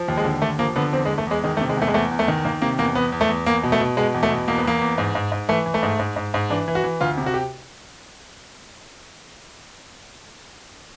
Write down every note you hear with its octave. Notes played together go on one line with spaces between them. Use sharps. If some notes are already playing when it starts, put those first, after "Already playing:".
Already playing: F3
D#2
G#3
D3
D#2 A3
F3 A#3
D3 B3
E2 C4
G#3
E2
A3
E2 G#3
D#3 G#3
A3
C3
G#3
E2 A3
G#3
E2 A3
E2
A3
D#3
D#3 A#3
C3 A#3
E2 A#3
E2 B3
E2
A3
E2
E2 A#3
B2
A3
B2
B2 G#3
E2
A3
B2
E2 A#3
B3
E2 A#3
E2
G#2
G#2
G#2
E3 A3
E3
A3
G#2
G#2
G#2
G#2
E3 D4
E3
F#4
E3
D2 F4
C3
F#4
G4